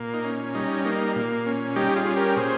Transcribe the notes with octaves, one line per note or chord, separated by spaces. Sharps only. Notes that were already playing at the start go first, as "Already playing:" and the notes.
Already playing: A#2 A#3
D#4
C#4
G3 D#4
A#3 D#4
A#2
C#4
G3 D#4 G4
F4 G#4
C#4
G4 A#4
A#2 G#4 C5